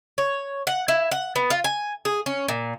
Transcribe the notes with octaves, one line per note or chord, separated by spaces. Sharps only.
C#5
F#5
E4
F#5
B3
F4
G#5
G#4
C#4
A#2